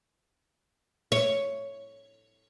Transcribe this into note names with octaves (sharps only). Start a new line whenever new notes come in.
C#5